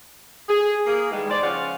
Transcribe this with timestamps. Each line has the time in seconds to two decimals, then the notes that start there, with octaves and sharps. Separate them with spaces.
0.49 G#4
0.87 A#3 G#4
1.11 D#3 E3 G3 G#3
1.30 C5 D5
1.42 C#3 F3 C#4 F5 F#5